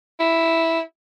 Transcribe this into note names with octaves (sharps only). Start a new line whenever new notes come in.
E4